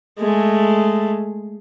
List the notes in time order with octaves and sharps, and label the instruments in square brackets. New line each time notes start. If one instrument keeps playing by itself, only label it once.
[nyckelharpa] G#3 A3